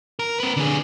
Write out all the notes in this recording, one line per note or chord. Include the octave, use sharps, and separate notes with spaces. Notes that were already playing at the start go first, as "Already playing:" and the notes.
A#4
C4 B4
D3 G#4